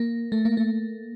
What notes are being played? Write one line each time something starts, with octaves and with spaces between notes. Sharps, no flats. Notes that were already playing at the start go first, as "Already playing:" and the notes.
Already playing: A#3
A3
A#3
A3